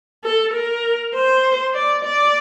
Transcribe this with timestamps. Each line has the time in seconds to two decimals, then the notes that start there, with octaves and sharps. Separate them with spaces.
0.24 A4
0.54 A#4
1.14 C5
1.75 D5
2.05 D5